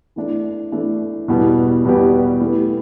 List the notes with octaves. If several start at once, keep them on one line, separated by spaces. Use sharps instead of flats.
E3 A3 D4
E3 A3 D4
E2 B2 G3 B3 G4
E2 B2 G3 B3 G4
E3 A3 G4 B4